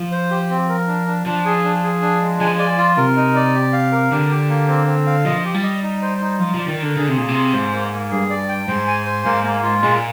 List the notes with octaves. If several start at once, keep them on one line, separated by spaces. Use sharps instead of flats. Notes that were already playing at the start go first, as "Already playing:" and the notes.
Already playing: F3
C5
G4
C4
A#4
D4
D4
F3 D4
G#4
D4
G#4
D4
G#3
F3 G#5
D5
F4
C3 A#4
D#4
D5
G4
F5
A#4
D3 G4
G4
A#3
C4
C4
F5
F3 D#5
G4
G3
D#5
D#4
C5
D#4
F3 F4
F3 D5
D#3
D3 A#4
D3 G#4
C3
A#2 G#4
C3
F4
G#2 C5
A#3
A#3
G2 G#4
D5
G5
G#2 C5
G#5
C5
G#2 A#3
A#3
F4
A#2 G#3